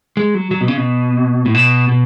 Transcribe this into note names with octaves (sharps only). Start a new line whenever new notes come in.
G#3
F#3
F#3
B2
C#3
B2
A2
B2
B2